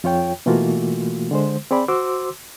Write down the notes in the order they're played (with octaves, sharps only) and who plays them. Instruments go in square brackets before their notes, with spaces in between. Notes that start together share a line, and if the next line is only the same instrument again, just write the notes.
[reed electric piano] F2 F4 C#5 G5
B2 E3 A3 A#3 F4 F#4
D3 G#3 C5
C4 G#4 D5 B5
F#4 C5 C6 D6 E6